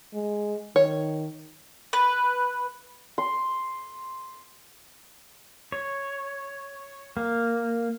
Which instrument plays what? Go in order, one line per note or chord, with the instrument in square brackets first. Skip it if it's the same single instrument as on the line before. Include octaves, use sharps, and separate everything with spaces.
[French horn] G#3
[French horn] D#3 [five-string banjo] C#5
[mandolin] B4
[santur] C6
[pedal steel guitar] C#5
A#3